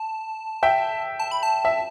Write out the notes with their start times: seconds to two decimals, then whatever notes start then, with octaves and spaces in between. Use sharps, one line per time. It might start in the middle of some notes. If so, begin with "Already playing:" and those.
Already playing: A5
0.63 E5 G5
1.19 A5
1.31 B5
1.43 A5
1.65 E5